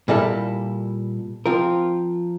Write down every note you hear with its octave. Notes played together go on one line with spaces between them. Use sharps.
A#2 G3 A#3 E4 A4
F3 C4 F4 A#4